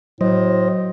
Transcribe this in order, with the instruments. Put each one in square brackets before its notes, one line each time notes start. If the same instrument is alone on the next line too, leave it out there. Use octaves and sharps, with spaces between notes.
[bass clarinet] A2 [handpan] F#3 [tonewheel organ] C5 D#5